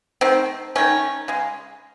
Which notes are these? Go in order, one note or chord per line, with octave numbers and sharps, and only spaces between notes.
D#3 A3 C4
D#3 A3 C#4
C#3 G#3